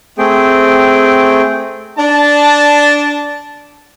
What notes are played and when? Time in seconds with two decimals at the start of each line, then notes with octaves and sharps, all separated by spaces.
0.18 A3 C4 G#4 G5
1.98 D4 A5